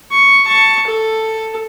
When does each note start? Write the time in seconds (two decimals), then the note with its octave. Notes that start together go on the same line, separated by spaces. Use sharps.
0.12 C#6
0.47 A5 C#6
0.87 A4